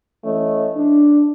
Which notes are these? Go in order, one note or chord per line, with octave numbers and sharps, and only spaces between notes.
E3 A3 C#4 D#5
D4